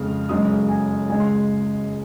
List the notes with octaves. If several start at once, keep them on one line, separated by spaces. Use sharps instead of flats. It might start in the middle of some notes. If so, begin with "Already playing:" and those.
Already playing: F2 C#3 G#3 F6
F#1 F#2 C#3 G#3 D#6
G#5
C#2 C#3 G#3 G#5
C6